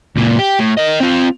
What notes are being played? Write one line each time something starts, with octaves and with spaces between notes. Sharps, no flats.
C#2 A#2
G4
A2
A#4 D#5
C4 F4